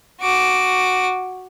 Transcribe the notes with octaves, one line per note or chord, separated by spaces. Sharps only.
F#4 D6